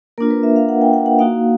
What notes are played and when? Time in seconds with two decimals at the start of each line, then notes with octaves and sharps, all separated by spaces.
0.18 A#3 D4 F4 A#4
0.31 B4
0.43 E5
0.56 F5
0.69 F#5
0.81 G5
0.93 F#5
1.06 F#5
1.19 A#3 D#4 F#4 F5